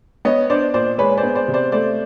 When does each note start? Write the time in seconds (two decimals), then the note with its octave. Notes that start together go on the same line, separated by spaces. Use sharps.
0.25 B3 C#5 D#5
0.50 D4 C5 D5
0.74 A#2 C5 D5
0.98 G#3 B4 C#5
1.17 C5 D5
1.23 B3
1.35 C5 D5
1.48 C3
1.54 C5 D5
1.72 A3 C5 D5